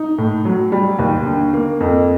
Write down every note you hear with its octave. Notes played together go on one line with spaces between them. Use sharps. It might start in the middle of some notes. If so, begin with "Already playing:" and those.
Already playing: D#4
A2
F#3
G3
D#2
D3
A#3
F2